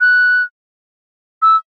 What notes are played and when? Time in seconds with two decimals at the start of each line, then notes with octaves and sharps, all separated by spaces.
0.01 F#6
1.42 E6